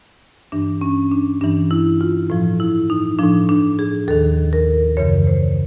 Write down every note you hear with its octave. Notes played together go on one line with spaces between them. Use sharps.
G2 E3 D4
C#4
D4
G2 E3 D4
E4
F4
A2 F3
E4
D#4
A2 F3 D4
D4
G#4
D#2 D#3 A4
A#4
F#2 C#3 E3 C#5
C5